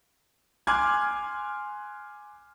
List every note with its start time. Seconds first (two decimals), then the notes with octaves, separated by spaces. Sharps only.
0.67 G#5 C6 D6 F6 F#6 G#6